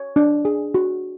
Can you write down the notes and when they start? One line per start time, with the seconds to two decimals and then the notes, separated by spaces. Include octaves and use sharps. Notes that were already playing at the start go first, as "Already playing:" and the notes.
Already playing: C#5
0.16 D4
0.45 G#4
0.74 F#4